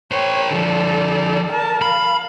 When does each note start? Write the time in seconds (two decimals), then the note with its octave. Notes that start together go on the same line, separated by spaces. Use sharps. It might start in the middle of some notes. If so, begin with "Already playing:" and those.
0.12 A#4 C5 C#5 G5
0.51 D3 F3 A4 D5
1.51 A#4 A5
1.82 F5 B5